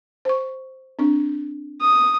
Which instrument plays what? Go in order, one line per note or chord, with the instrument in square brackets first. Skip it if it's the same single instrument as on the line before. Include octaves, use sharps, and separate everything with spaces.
[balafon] C5 C#6
C4 D4
[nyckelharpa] D#6